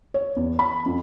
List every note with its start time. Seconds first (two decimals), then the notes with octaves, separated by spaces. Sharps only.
0.14 C#5
0.36 E2
0.59 B5
0.86 F2